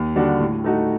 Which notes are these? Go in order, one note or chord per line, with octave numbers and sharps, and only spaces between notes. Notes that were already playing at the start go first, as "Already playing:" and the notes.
Already playing: D#2
D3 G3 D4 F#4
A2
A3 D#4 F#4